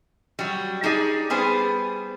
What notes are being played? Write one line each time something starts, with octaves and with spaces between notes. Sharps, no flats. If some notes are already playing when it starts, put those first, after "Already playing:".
F#3 G3
D4 D#4 G4 G#4 D5
G3 B3 G#4 B4 C5